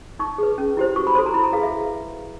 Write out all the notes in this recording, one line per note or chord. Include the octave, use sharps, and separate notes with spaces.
D#4 C#6
G#4 B4
C#4
E4 G4 C5
F#4 C#6
B5
A4 C5 C6
A#5
E4 B5
A#5
G#4 B4 F5
E5
E4